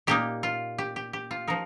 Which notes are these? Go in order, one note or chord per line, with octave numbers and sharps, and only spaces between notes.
A#2 A#3 D#4 G4
F4
G4
G4
G4
F4
F3 D#4 A#4